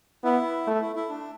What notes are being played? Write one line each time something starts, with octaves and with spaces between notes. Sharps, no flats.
B3 E4
A3
E4
E4
D4